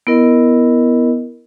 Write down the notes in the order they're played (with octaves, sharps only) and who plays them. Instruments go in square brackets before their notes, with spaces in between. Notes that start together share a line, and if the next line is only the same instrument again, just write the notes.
[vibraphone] B3 E4 A#4 D#5